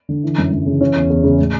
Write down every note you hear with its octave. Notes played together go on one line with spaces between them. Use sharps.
D3
E3
F#2
F#2
C#3
E3 C#4
E2
E2
C#3
A2